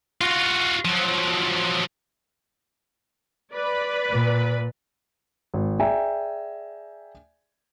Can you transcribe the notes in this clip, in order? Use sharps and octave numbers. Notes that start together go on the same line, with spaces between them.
F4 F#4
F3 F#3
B4 D5 B5
A#2
G#1
G#4 D5 E5 G5 G#5 A#5